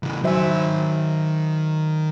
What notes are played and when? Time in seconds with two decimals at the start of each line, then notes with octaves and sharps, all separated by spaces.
0.03 C#3 E3
0.24 D#3 F#3 C5 E5 G#5